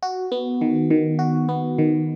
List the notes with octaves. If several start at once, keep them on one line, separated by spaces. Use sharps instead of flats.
F#4
B3
D#3
D#3
F#4
B3
D#3